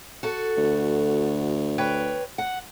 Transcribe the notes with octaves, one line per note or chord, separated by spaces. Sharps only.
F#4 A4
D2
B4 C#5 G5
F#5